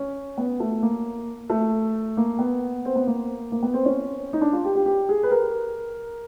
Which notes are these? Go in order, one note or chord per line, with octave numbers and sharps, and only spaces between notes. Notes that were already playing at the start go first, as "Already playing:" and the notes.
Already playing: C#4
B3
A3
A#3
A3
A#3
B3
C4
B3
A#3
A#3
B3
C4
C#4
D#4
D4
F4
G4
G4
G4
G#4
B4
A#4